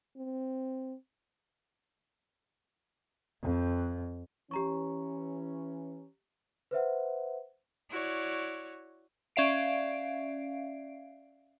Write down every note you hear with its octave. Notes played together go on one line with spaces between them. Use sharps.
C4
F2
E3 C#4 G4 A#5 C#6
B4 C5 E5 F#5
E4 F#4 C#5 D5
C#4 D5 E5 F5 C7 D7